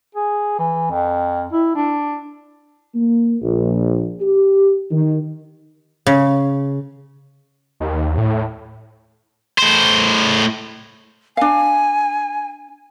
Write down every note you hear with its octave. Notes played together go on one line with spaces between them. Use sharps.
G#4
E3
F2
E4
D4
A#3
A#1
G4
D#3
C#3
D#2
A2
A2 C5
D4 F5 G#5